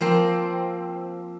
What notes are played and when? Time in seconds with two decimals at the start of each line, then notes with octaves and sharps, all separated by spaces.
0.01 F3 A#3 C4